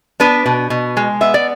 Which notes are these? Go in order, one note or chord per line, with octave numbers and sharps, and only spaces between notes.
B3 D4 B4
B2
B2
G#3
B3 E5
D5